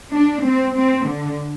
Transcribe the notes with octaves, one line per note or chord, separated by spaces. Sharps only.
D4
C4
C4
D3